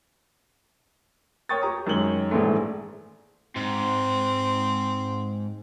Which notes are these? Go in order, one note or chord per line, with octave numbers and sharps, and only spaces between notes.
A#4 C#5 G5 C#6 D#6 A6
G4 A#5 D#6
F#2 D#3 G#3 C#5 F#7 G7
A#1 G#2 E3 G#3 A3
G#2 C4